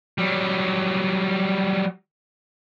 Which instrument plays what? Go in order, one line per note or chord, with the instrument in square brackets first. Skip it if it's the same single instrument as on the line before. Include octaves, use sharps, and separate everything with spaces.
[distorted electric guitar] F#3 G3